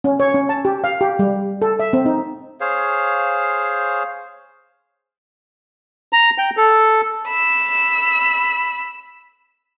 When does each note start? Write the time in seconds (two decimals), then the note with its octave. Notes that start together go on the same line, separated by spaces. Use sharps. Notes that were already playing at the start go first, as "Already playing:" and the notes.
0.04 C#4
0.20 C#5
0.34 C#4
0.49 A5
0.65 G4
0.84 F5
1.01 G4
1.19 G3
1.62 A4
1.80 E5
1.93 C4
2.06 D#4
2.61 G#4 C5 C#5 F5
6.13 A#5
6.38 G5
6.57 A4
7.27 B5 E6